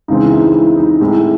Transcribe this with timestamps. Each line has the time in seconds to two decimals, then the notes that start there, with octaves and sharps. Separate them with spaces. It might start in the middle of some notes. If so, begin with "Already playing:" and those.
0.08 C#2 C#3 E3 G#3 C4 D#4
0.32 E4
0.47 D#4
0.54 E4
0.77 D#4
1.01 A2 G#3 C4 E4